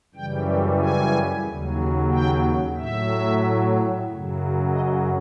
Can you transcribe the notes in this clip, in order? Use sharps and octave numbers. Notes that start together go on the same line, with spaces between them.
F#2 C#3 E3 G3 G5
G#5
D#2 C#3 F#3
G5
A2 F#3 E5
F#2 C#3 F#3
D#5